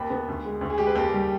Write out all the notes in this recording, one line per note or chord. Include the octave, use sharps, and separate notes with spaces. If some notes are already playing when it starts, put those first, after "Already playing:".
Already playing: D#2 B5
B3
D2
G#3
D2
G#4
G#3 G4
B4
D#2 G4
G3